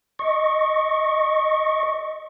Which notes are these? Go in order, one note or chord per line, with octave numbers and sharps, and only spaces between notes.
D#5 C#6